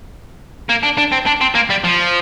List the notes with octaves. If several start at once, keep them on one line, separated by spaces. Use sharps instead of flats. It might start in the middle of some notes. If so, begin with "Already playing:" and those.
A#3
D4
D4
C4
D4
C4
A#3
G3
F3